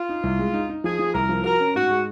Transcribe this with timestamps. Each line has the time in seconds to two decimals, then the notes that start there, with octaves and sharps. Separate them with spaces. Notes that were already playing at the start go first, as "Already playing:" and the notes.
Already playing: F4
0.09 D#4
0.23 C2
0.39 G#3
0.54 D#4
0.69 D#4
0.84 F3 G#4
0.99 F3
1.14 C2 A#4
1.29 F3
1.44 F#4 A#4
1.60 C#4
1.75 G#2 F#4
1.90 G#3